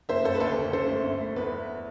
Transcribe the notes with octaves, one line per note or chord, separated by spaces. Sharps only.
F#1 C5 E5
F#1 A4 C5
B4
D2 A4 C5
D2
F#2 A4 C5
A3
G1
A3
E2 B4
A3